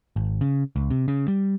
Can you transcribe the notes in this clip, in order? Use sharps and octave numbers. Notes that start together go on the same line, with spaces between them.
G#1
C#3
C#2
C3
C#3
G3